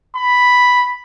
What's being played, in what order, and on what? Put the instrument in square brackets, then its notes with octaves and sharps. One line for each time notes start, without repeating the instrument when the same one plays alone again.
[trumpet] B5